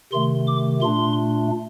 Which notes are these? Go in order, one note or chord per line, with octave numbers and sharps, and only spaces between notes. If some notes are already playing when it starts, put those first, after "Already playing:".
C3 D#3 A3 C6
D6
A#2 A3 D4 C6